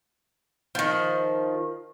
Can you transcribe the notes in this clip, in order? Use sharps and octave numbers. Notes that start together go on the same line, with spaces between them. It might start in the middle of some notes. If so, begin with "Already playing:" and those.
D#3 F3